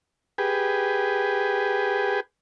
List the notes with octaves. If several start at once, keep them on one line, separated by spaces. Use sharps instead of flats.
G4 G#4 B4